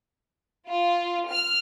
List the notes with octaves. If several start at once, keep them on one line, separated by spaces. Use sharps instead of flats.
F4
F6